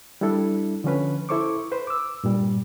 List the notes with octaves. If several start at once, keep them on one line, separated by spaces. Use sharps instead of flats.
G3 D4 E4 A4
D3 F3 C#4 B4
E4 A4 C5 C#6 D6
B4 C5
D6 E6
G2 A#2 G3